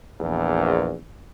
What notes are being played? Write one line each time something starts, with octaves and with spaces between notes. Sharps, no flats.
A#1 E2